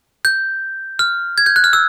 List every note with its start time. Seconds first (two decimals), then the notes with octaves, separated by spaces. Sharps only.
0.25 G6
0.99 F6
1.38 G#6
1.46 G6
1.56 F#6
1.64 F6
1.73 E6